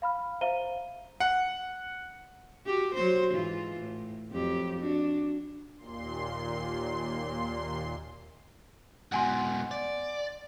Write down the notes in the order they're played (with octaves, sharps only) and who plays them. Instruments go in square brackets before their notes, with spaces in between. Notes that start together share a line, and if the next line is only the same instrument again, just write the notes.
[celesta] F5 B5 F6
C5 E5 F5 A#5 D#7 G7
[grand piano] F#5
[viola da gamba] F#4 G4
F#3 F#4 C5
G#2 E3 F4
A2
F2 F#3 G4
D4 F#4
[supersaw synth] D#2 A#2 C6
[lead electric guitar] G#2 B2 [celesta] F#5 G#5 C6
[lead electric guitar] D5